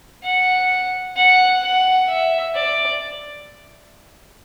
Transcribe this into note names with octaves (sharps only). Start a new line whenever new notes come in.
F#5
F#5
F#5
E5
D5